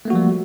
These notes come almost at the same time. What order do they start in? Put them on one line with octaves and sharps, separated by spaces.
A3 A#3 F#4 F3 G3